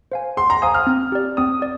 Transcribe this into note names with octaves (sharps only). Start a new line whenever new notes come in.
C5 F5 G#5
G#4 C6
A#5
C5 F5 G#5 D#6
F6
C4
G4 D5
C4 D#6
D5